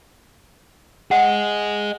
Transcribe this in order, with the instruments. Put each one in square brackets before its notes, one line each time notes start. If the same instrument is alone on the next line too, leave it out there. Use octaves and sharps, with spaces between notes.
[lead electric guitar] G#4 D#5 [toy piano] F#5